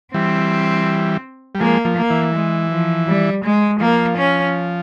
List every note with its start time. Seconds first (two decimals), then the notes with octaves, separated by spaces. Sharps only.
0.14 E3 G3 C4
1.55 G3
1.60 F3 G#3 A#3
1.85 F3
1.97 A#3
2.10 E3
2.35 G#3
2.70 F3
3.08 G3
3.45 G#3
3.80 F3 A#3
4.18 C#4